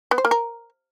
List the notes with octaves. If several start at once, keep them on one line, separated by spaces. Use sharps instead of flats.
B3
C5
A#3
A#4